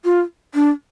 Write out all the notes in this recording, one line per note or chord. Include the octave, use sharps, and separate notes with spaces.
F4
D4